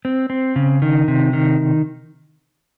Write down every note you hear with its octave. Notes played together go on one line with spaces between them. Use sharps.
C4
C4
C#3
D#3
C3
D#3